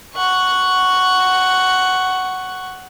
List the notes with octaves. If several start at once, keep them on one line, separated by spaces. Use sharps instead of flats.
F#5 C#6